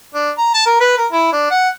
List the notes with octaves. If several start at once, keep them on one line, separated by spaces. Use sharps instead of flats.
D4
A#5
A5
A#4
B4
A#4
E4
D4
F#5